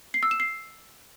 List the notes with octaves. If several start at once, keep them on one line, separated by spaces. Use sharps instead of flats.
C7
E6
E7
C7